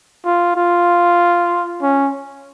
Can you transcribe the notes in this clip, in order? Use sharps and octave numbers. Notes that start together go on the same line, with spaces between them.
F4
F4
C#4